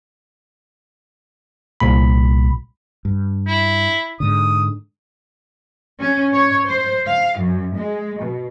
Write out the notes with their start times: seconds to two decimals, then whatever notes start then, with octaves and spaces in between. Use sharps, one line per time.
1.80 C2 A#2 B5
3.05 G2
3.47 E4
4.20 G#2 D3 D#6
6.00 C#4
6.34 C#5
6.68 C5
7.07 F5
7.38 F#2
7.75 G#3
8.18 B2